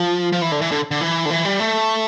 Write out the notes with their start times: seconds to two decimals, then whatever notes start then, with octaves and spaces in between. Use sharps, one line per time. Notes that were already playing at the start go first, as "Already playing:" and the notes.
Already playing: F3
0.32 F3
0.42 E3
0.52 D3
0.61 E3
0.71 D3
0.91 D3
1.01 E3
1.26 D3
1.30 E3
1.45 G3
1.60 A3